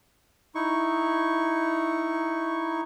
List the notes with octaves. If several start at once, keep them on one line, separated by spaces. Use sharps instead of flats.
D#4 E4 C#6